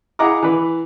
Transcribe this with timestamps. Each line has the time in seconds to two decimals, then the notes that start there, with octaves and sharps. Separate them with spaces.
0.19 E4 G#4 D#5 F#5 A#5 D6
0.42 E3 B4